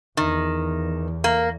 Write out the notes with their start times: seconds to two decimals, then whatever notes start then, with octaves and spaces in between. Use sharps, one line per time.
0.17 E2 D#3
1.24 A#3